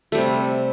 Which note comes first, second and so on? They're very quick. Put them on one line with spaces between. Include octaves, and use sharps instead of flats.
A3 G3 C3